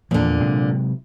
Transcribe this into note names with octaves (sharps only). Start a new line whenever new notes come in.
E2 A#2 D3 F3
C3 F#3 G#3